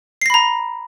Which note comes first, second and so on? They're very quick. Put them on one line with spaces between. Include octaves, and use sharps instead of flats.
C7 A#6 B5 A#5